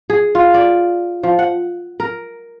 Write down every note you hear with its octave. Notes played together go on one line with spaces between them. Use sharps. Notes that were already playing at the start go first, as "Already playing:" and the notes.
G#4
F4
D5
F3
F#5
A#4